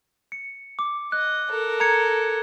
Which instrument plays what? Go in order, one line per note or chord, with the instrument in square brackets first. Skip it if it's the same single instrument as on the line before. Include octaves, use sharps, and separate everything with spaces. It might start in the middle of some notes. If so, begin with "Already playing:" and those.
[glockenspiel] C#7
D6
[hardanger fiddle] D#5 [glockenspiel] F#6
[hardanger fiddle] A4 A#4
[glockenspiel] A#5 G#6 C#7